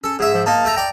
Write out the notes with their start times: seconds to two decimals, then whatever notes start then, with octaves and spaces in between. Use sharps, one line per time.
0.04 C#4 A4
0.19 G#2 G#4 E5
0.34 F3
0.46 A#3 D#4 A5
0.65 A3 G5 A#5
0.76 D5 G5 A#5